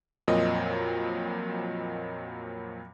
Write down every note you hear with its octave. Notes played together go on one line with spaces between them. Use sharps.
F2 A#2 F#3 C4 D#5